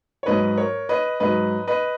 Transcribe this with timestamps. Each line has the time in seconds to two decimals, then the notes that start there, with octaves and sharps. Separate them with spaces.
0.23 C#5
0.26 G#2 F#3 B4 D#5
0.57 A#4 C#5
0.89 B4 D#5
1.20 G#2 F#3 B4 D#5
1.67 B4 D#5